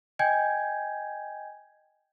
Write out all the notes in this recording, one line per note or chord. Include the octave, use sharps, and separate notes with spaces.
D#5 G5 G#5 G6 G#6